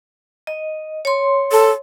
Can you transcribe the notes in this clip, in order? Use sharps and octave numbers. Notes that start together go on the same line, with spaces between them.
D#5
C#5 C6
A4